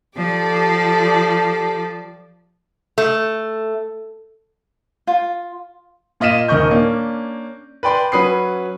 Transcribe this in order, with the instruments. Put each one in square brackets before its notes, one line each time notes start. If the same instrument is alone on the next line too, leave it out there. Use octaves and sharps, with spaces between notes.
[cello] F3 [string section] G4 A4 D5
[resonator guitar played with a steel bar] A3
[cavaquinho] F4
[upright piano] A#2 F4 D#5 B6 D#7 E7
D#1 D#3 A#4 D#5 C#6 G6
A#3 C#4 D4
B4 D5 G5 C6
F#3 C#4 B4 D#6 C7